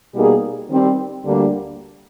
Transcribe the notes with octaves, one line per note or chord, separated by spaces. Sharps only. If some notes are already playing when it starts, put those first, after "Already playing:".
B2 G3 A#3 D#4 G#4
D#3 G3 C4
D2 D3 G3 A#3 D4